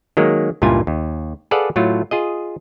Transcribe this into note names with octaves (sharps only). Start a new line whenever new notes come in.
D#3 F#3 G#3 A#3
C#2 G2 A#2 E4 F4 G#5
D#2
G#4 A4 B4 D5 F5 F#5
A2 F#3 A3 F4
F4 G#4 D#5